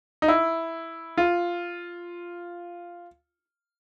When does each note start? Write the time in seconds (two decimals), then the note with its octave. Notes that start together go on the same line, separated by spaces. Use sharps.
0.22 D#4
0.28 E4
1.17 F4